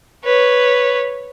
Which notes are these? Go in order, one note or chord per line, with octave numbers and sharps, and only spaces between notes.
B4 C#5